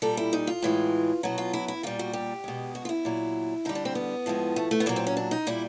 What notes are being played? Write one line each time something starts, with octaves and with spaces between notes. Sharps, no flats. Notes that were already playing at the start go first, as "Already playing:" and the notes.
A#2 G3 A4
E4
D#4
F4
A2 E3 G#3
B2 F#3 F#4
F4
E4
E4
A#2 G3 F4
F#4
G4
B2 G#3
F#4
F4
E4
A#2 F#3
D3 G3 D#4
D4
C4
B3
A2 F3 G#3
A3
A3
B3
A#2 F#3 A#3
C4
C#4
D4
D#4
A#2 G3 E4